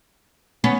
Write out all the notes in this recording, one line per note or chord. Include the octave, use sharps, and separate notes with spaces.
B3 C#4